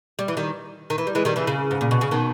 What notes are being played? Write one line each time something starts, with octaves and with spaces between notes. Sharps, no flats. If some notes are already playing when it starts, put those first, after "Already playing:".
G3
E3
D#3 G3
D#3
E3
G3
E3 G#3
D#3 G3
C#3 E3
C#3
G#2
A#2
B2
C#3
B2 D#3